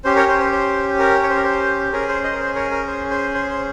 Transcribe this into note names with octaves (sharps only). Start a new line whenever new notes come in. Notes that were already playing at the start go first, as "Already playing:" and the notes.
C#4 G4 C5
A#4 C#5
C5
C5
C5
A#4
C#5
C5
A#4
C5
C#4 G#4 A#4
C5
C5 D#5
A#4
C5
A#4 C#5
A#4
C5
C5
C5
C5